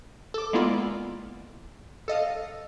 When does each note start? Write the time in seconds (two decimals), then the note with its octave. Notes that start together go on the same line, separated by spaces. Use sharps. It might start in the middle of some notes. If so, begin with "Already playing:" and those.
0.34 A4 D6
0.53 G#3 A#3 B3 E4 F4 D5
2.08 A4 D#5 F5